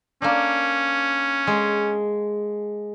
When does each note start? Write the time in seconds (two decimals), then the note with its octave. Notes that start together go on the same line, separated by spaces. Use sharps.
0.22 A#3 C#4 D4
1.47 G#3